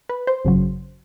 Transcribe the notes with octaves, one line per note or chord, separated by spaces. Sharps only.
B4
C5
G#1 F#2 C#3 F#3